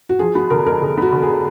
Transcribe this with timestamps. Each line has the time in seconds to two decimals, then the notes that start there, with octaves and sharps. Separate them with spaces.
0.09 F#4
0.19 F3 G#4
0.35 B3 F#4
0.50 D3 A#4
0.66 F2 A#4
0.82 D3 G#4
0.97 B3 F#4
1.12 D3
1.22 G#4